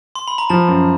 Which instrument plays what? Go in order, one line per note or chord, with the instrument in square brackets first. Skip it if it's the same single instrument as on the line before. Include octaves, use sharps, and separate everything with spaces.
[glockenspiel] C6
B5
A#5
[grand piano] F3 [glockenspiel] A5
[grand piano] F#2